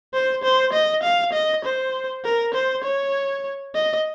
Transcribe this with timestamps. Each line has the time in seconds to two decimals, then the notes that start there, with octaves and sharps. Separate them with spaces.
0.14 C5
0.44 C5
0.73 D#5
1.03 F5
1.33 D#5
1.65 C5
2.25 A#4
2.54 C5
2.84 C#5
3.75 D#5